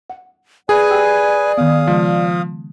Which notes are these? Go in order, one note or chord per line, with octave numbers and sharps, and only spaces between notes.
F#5
G#4 B4 D5 G#5
G4 G5 E6
D#3 B3 F5 D#6
C#3 F3 G#3